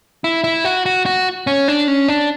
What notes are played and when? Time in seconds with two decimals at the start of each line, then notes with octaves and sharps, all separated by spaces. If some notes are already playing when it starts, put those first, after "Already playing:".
0.24 E4
0.44 E4
0.65 F#4
0.86 F#4
1.06 F#4
1.47 C#4
1.68 D4
1.88 C#4
2.08 D4